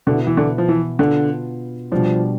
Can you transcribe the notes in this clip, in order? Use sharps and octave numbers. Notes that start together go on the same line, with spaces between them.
B2 D3 B3 E4
E3
D3
F3
E3
B2 D3 B3 D4 F4
B2 F3 G3 D4